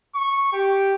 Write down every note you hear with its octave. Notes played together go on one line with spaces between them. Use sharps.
C#6
G4